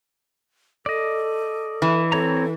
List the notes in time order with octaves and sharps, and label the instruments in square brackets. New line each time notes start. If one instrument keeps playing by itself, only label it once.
[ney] A4 [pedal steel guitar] D5 D#5
[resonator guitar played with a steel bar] E3
[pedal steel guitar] C4 C#5 A#5 [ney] A4